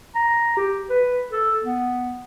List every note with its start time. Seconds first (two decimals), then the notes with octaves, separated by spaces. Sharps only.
0.15 A#5
0.57 G4
0.90 B4
1.32 A4
1.63 B3